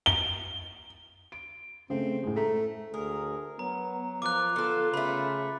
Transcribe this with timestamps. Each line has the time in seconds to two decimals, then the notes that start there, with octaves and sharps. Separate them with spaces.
0.06 G7
1.32 D7
1.90 C#3 A3 C4
2.23 A2 G#3
2.36 A3 A#5
2.94 D2 G#4 A#4
3.59 F#3 B3 A#5
4.22 F3 F4 A#4 D6 F#6
4.56 D3 B3 F4 A4
4.94 C#3 A3 B4 B5